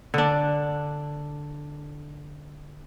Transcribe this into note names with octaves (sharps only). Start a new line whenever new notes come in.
D3 D4